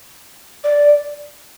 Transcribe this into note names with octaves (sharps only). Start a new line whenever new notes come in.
D5